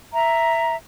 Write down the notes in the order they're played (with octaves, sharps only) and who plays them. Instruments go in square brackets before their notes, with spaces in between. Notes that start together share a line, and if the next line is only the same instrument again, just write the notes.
[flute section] E5 A#5